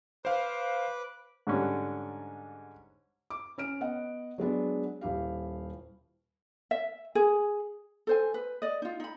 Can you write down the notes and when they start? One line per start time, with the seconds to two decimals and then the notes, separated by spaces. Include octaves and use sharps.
0.25 B4 C5 F5 D6
1.47 G#2 D3 G3 C#4
3.30 D6
3.58 C#4 F6 D7
3.80 B3 D#5 F#5
4.38 F#3 G#3 B3 D4
5.01 D#1 E4 G4 F5
6.71 E5
7.15 G#4
8.07 A4 C5 G#5
8.34 B4
8.62 D5 D#5
8.82 D#4 F4
9.00 D#4 B5